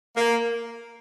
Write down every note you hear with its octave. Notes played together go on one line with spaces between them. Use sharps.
A#3